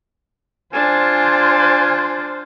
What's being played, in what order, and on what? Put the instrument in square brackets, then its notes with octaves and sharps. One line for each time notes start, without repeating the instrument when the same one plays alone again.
[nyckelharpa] D4 [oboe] F4 [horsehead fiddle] C5 [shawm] G#5